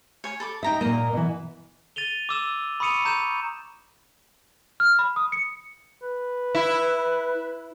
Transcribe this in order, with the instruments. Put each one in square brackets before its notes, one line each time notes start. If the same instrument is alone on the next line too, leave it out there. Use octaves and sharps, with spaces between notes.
[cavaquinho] C#5 G#5 C#6
A4 B5 D6
[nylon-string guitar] D#4 E5 [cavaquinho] G5 A#5 D#6
[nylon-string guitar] A#2 A#3 [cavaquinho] D#5 A#5
[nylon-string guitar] B2 E3
[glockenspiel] A6 D#7 F7 G7
D6 E6 E7
B5 C#6 D#6 C#7 D#7 F7
A#5 G6 E7
[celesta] F6
B5
D#6
C#7
[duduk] B4
[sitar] E4